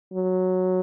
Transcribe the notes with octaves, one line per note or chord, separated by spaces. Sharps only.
F#3